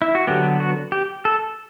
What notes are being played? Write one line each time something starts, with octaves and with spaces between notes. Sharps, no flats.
E4
F#4
D3 F#3 B3 G4
F#4
G4
A4